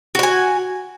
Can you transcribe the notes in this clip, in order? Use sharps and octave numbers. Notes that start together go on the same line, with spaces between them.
F#4 F#5 G#5